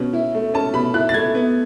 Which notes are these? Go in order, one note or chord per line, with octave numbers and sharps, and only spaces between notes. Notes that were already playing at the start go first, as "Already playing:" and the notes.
Already playing: B2 C#4
E4
A3
C#4 A5
B2 B5
E4 F#6
A6
A3 G#6
B3